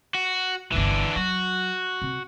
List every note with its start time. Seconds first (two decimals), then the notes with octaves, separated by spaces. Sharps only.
0.15 F#4
0.72 G1 C2 E3 D4
1.16 F#3 F#4
2.02 C3